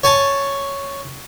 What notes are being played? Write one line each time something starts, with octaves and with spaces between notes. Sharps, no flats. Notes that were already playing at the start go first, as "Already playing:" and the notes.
C#5 G#5 A5